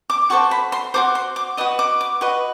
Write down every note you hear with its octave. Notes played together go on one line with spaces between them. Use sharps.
D6
F#4 A4 C5 C#6
B5
C6
F#4 A4 C5 D6
C6
D6
F#4 B4 D#5 D#6
D6
D6
F#4 B4 D#5 C#6